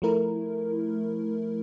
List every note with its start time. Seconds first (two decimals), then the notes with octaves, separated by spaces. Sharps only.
0.02 F3 A3 E4 A#4